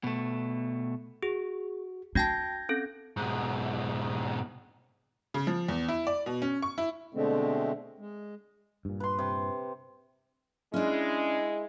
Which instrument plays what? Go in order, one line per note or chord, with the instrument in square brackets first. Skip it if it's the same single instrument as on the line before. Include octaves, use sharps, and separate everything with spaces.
[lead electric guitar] B2 A3
[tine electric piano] F#4 [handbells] G#4
[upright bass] D4 [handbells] F#4 G5 A5 [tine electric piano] G6 G#6 A#6
[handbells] C4 C#4 A4
[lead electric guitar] G#2 B2
[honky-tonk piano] C#3
F3
E2
E4
D5
B2
C#4
C#6
E4
[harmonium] B2 D3 G#3 A3 C4
G#3
[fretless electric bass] G2 A#2
[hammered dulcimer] B4 C6
C3
[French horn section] G#3 E4 [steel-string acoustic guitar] C#4 D4